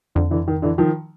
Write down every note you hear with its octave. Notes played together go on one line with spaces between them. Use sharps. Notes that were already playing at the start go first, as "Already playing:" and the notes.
F2 D3
D3 E3
D#3
D3 E3
D#3 F3